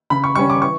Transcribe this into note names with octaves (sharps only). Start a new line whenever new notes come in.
C#3 B5
C#6
G3 C#4 C#6
D6
E3 C#6